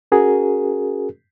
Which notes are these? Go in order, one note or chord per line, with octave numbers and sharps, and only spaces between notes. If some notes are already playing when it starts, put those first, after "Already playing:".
C#4 F#4 G#4 A#4